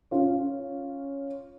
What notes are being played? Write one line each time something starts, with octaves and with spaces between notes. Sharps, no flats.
C#4 F4 C#5